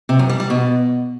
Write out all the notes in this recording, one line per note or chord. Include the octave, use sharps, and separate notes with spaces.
C3
F#2
G3
G3
B2